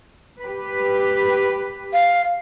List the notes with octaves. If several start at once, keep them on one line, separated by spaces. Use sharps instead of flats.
G4 B4
F5